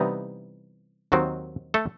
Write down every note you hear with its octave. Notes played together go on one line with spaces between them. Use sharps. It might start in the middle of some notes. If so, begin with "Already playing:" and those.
Already playing: C3 E3 G3 B3 D#4
D#2 D#3 F#3 C4 F#4
A3 A4